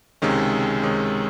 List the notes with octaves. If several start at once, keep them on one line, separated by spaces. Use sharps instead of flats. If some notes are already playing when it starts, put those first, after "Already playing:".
C#2 C3 D#3 G#3 C#4
C#2 C3 D#3 G#3 C#4